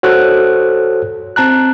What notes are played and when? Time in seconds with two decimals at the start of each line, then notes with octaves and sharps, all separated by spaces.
0.03 F#4 A4 C5 C#5 F#6
1.36 C4 A5 A#5 F#6